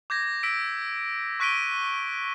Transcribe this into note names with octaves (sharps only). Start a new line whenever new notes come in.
D6 G6 G#6 A#6
E6 B6 D7
C#6 F#6 B6 D7 D#7 G7